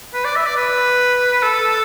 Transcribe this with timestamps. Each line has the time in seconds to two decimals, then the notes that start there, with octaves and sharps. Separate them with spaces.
0.14 B4
0.25 D5
0.36 E5
0.46 D5
0.57 B4
1.42 A4